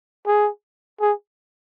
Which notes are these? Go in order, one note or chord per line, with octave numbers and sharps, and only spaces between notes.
G#4
G#4